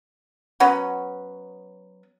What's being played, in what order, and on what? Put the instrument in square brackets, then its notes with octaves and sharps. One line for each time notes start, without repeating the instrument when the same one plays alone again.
[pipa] F#3 B3 C#4